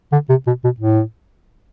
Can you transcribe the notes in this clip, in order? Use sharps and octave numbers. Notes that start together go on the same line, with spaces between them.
D3
C3
B2
B2
A2